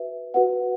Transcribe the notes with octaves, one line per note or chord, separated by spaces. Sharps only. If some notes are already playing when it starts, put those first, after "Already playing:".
Already playing: F#4 B4 E5
F#4 B4 F#5